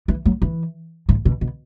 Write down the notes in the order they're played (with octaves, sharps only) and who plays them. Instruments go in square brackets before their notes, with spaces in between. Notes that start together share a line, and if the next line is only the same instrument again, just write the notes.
[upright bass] E3
F#3
E3
A2
B2
B2